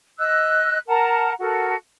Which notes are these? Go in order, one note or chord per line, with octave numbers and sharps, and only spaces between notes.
D#5 E6 F#6
A#4 F#5 A5 A#5
F#4 A4 A#4